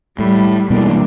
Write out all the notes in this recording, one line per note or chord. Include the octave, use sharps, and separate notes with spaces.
A2 G3
B2 E3 G3 G#3 A#3 D4